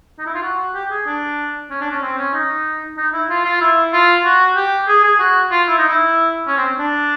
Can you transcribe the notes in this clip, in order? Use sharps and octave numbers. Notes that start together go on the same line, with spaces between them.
D#4
E4
F4
F#4
G4
G#4
D4
C#4
D4
C#4
C4
C#4
D#4
D#4
E4
F4
F4
E4
F4
F#4
G4
G#4
G#4
F#4
F4
E4
D#4
E4
C#4
C4
D4